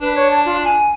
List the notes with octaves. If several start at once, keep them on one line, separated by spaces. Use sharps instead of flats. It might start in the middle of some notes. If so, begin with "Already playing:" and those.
D4 B4
C#5
A5
F4
G#5